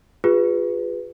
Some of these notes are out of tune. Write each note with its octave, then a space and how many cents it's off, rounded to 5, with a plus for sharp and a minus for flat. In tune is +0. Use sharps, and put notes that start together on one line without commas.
F4 +15 G#4 -30 B4 +0